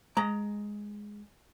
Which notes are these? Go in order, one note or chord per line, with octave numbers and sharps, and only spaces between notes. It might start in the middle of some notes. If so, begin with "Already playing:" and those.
G#3 A#5